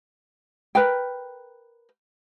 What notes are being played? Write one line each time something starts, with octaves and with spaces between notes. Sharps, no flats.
A#4 B4 G5